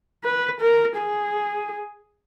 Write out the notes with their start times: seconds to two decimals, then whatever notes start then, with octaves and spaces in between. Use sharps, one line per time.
0.24 B4
0.61 A#4
0.98 G#4